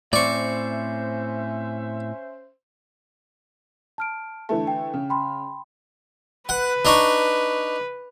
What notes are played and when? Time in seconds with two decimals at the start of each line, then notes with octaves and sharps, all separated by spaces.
0.13 A2 C4 C#4 C5 D5 E5 C#6
3.98 A5 F6 D7
4.49 D3 E3 A3 A5
4.67 G5
4.94 C#3
5.10 G5 B5 C6
6.49 B4 F#5
6.85 D4 D#4 C#6